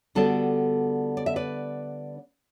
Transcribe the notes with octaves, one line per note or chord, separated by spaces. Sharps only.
D3 G3 B3 D4 F#4 A4
D5
E5
B4 D5